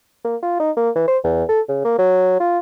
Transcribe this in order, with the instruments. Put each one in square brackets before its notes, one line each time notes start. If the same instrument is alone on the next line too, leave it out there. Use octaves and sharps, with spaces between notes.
[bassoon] A#3
F4
D#4
A#3
E3
C5
E2
A4
C#3
A#3
F#3
F4